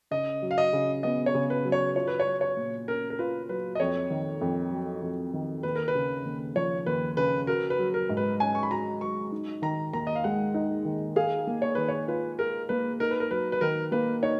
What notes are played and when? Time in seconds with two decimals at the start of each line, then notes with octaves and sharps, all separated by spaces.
0.11 C#3 D#5
0.42 F#3
0.51 F5
0.58 D#5
0.73 C#3
1.03 B3 D#5
1.26 C#5
1.34 C#3
1.50 B4
1.65 F#3
1.72 C#5
1.96 F4 C#5
2.08 B4
2.20 C#5
2.26 F#3
2.41 C#5
2.57 A#2
2.87 C#4 A#4
3.10 A#4
3.19 F4 B4
3.49 F#3 B4
3.75 D#5
3.80 F2 C#5
4.10 D#3
4.41 F2
4.71 F#3
5.02 F2
5.33 D#3
5.63 D#2 B4
5.76 A#4
5.88 B4
5.95 C#3
6.25 D#2
6.56 F3 C#5
6.86 D#2 B4
7.17 C#3 B4
7.47 F#4 A#4
7.70 B4
7.79 F#3
7.94 A#4
8.09 G#2
8.17 B4
8.40 C#4 G#5
8.55 C#6
8.63 B5
8.71 F#4 A#5
9.01 F#3 C#6
9.32 D#4
9.62 D#3 A#5
9.93 D#2 A#5
10.07 D#5
10.15 F5
10.24 G#3 F#5
10.54 D#4
10.85 D#3
11.16 G#4 F5
11.47 A#3
11.62 C#5
11.75 D#3 B4
11.88 C#5
12.08 F4 B4
12.39 G#4 A#4
12.69 A#3 B4
13.00 D#4 A#4
13.11 B4
13.20 A#4
13.30 F#3 B4
13.52 B4
13.61 D#3 A#4
13.92 A#3 B4
14.22 D#4 C#5